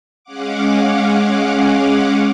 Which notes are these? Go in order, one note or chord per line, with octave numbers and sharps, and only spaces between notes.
G#3 C#4 F5 F#5 D6